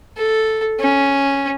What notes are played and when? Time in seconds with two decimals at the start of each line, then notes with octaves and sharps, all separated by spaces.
0.17 A4
0.80 C#4